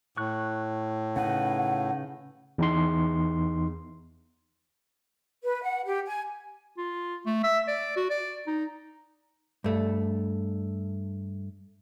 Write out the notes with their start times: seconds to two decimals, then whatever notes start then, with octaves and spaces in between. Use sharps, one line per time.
0.17 A2 C#6 F#6
1.16 C#3 D#4 B4 F#5
2.58 E2 D#4 C6
5.43 B4
5.62 F#5
5.86 G4
6.06 G#5
6.77 F4
7.26 A3
7.44 E5
7.68 D5
7.96 F#4
8.10 D5
8.47 D#4
9.64 G2 A3